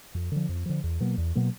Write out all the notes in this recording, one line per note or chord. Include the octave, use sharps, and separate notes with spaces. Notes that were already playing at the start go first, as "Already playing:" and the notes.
F2
D3 F3
F2
D3 F3
E2
B2 F#3 A#3
E2
B2 F#3 A#3